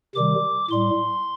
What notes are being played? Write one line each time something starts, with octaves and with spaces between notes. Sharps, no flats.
C3 D#3 G3 D6
A2 G3 C6